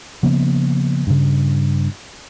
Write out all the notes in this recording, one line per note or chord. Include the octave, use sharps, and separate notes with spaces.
C#3 F3 A#3 B3
G2 C#3